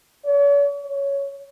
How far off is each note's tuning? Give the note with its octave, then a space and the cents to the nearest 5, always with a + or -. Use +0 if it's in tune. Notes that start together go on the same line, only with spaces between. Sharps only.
C#5 +45
C#5 +5